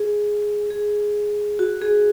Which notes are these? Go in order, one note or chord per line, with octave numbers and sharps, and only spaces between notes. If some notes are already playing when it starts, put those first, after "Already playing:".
Already playing: G#4
G#4
F#4
G#4